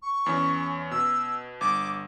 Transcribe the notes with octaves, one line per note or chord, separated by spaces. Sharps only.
C#6
E2 C#4
B2 E6
G1 D6